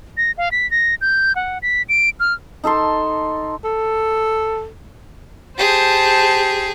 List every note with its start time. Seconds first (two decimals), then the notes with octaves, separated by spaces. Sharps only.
0.17 A#6
0.38 F5
0.52 B6
0.71 A#6
1.01 G6
1.36 F#5
1.62 B6
1.89 D7
2.20 F6
2.64 D#4 A4 A5 C6
3.64 A4
5.57 G4 G#4 C5 A5